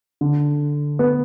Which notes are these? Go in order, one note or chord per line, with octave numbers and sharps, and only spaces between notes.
D3
B3